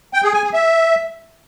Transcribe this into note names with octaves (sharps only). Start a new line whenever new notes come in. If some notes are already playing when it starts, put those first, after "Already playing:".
G5
G#4
G#5
G#4
E5